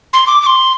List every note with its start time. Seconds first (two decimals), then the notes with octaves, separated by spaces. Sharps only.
0.13 C6
0.27 D6
0.42 D6
0.47 C6